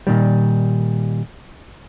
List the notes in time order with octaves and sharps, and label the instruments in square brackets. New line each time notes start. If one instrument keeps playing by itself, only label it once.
[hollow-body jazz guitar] A#2 D#3 G3